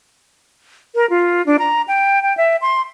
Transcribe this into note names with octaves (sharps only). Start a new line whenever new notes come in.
A#4
F4
D4
A#5
G5
G5
E5
C6